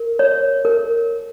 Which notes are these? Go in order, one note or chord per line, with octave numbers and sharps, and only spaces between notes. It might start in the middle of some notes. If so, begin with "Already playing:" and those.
Already playing: A#4
C#5
A#4